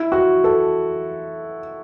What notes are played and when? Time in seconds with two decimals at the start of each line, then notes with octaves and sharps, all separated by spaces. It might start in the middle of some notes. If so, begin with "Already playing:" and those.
Already playing: E4
0.12 F#4
0.44 A4